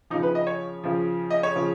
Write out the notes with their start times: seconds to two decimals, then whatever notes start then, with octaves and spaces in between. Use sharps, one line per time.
0.10 C#3 F3 D#4
0.23 B4
0.35 D#5
0.47 C#5
0.84 C#3 F3
1.30 D#5
1.43 C#5
1.55 C#3 F3